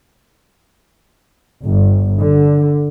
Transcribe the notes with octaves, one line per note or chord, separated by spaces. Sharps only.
G1
D3